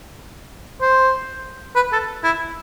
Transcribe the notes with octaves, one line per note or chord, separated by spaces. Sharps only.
C5
B4
A4
E4